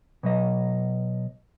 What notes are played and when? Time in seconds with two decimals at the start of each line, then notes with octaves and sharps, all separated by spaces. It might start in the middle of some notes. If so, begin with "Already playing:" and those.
0.23 B2 F#3 D#5